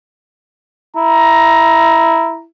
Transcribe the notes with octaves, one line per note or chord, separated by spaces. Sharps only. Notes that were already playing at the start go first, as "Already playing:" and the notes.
E4 A#5